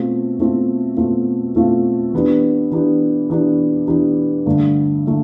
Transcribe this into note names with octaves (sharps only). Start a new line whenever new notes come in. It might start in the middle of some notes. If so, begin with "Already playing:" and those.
Already playing: B2 A3 C4 F4
B2 A3 C4 F4
B2 A3 C4 F4
B2 A3 C4 F4
E3 B3 D4 G4
E3 B3 D4 G4
E3 B3 D4 G4
E3 B3 D4 G4
G2 D3 A3 D4
D3 A3 D4